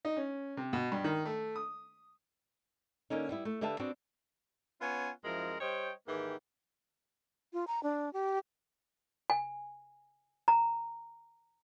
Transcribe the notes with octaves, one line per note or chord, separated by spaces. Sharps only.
D#4
C#4
C3
B2
G2
D#3
A3
D#6
D3 A#3 C#4 D#4
G3 B3 E4
A3
D3 G4 B4 E5 F5 A5
B3 C4 D4 F#4
B3 C#4 F4 C#5 G#5
F#2 F3 G#3 E4 A#4
G3 C5 C#5 D#5 G5
G#2 D#3 E3 A#3 G4
F4
A#5
D4
G4
G#5
A#5